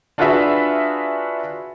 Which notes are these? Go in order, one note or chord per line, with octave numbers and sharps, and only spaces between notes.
D4 F4 F#4 G#4 B4 E5